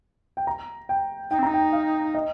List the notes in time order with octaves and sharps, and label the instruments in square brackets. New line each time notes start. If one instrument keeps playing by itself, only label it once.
[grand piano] G5
A#5
G5
[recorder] D#4 [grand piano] G5
[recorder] C4
[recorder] D#4 [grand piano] A#5
[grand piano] G5
F5
D#5